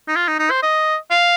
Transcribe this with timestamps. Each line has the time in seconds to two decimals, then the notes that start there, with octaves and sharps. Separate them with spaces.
0.08 D#4
0.16 F4
0.28 D#4
0.39 D#4
0.51 C5
0.63 D#5
1.11 F5